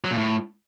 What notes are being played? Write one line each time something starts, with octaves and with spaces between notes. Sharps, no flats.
F#3
A#2
A2